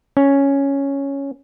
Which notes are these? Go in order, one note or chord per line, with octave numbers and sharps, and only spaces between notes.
C#4